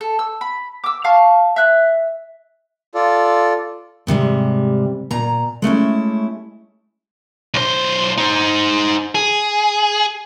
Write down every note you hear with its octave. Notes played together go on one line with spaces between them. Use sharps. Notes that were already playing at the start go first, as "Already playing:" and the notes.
A4
E6
B5
D6 E6
F5 A5 C#6
E5 F#6
F4 A4 D5
G#2 C3 G3 G#3
A#2 A#5
G#3 A3 C#4 E4
B1 C5
D#4 C5
G#4